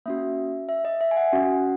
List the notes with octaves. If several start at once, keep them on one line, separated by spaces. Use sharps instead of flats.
A#3 C#4 F#4 E5
E5
D#5
E5
G#5
F#5
C#4 F#4